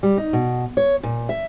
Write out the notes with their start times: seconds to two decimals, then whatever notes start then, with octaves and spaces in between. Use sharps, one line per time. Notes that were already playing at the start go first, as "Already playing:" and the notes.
0.03 G3
0.18 D#4
0.33 B2
0.77 C#5
1.03 A#2
1.29 E5